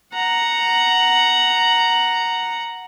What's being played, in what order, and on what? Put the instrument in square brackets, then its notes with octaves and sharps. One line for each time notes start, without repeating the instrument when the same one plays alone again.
[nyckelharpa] F#5 A#5